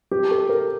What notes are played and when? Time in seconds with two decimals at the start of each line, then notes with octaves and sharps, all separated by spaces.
0.11 G4
0.31 A4
0.49 A#4